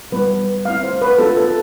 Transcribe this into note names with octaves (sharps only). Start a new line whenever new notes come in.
G3 B3 E4 B4
A3 C4 E4 F5
C5
B4
B3 F4 A4
A4